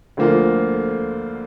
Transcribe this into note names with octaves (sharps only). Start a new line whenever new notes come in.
D2 D3 F3 A#3 F4